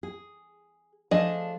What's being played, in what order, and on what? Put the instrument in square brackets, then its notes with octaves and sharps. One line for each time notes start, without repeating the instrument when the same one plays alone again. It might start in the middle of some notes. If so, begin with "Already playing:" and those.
[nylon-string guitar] G#4
[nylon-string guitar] F3 A3 F5 [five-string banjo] D4 G#4 D#5